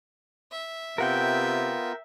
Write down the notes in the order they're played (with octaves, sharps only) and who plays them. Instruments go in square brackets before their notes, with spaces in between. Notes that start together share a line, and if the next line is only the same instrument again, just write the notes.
[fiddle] E5
[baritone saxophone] C3 [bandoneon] B3 F4 [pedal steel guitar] A#4 F#5 G5